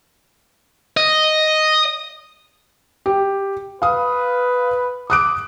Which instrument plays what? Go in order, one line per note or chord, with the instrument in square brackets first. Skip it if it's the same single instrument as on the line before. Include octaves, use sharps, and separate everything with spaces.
[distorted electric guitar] D#5
[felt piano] G4
[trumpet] B4 [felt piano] F5 D#6
[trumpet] D6 [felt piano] D#6 F#6 D7